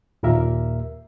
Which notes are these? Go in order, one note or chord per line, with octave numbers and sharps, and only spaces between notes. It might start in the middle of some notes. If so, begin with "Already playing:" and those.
D#2 A#2 A#3 A#4 E5